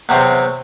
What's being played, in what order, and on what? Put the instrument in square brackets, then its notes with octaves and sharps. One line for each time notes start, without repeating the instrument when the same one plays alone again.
[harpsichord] E2 C3 F#3 C4